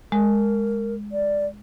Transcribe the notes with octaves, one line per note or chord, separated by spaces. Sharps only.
G#3 A#4
D5